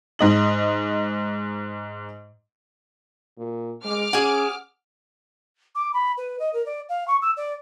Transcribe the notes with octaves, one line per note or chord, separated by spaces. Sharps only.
G#2 D#5 F#7
A#2
G#3 D6 F6
C#4 G#4 F#5 G#5
D6
B5
B4
D#5
A#4
D5
F5
C#6
E6
D5